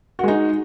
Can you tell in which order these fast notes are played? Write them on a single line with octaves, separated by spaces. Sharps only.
F#4 G#3 D#4